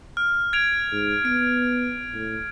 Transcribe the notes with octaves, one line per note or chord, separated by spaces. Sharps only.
F6
G#6 D7 F7
G#2
B3 D7
A2